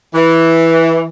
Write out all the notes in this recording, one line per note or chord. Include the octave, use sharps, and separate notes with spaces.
E3